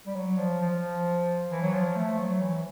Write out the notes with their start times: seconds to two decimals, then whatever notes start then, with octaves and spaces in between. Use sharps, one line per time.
0.07 G3
0.15 F#3
0.38 F3
0.61 F3
1.51 E3
1.62 F#3
1.73 F3
1.96 A3
2.18 F#3
2.41 E3